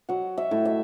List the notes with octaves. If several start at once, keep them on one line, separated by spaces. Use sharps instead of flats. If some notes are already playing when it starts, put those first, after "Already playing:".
F#3 F#5
E5
A2
E5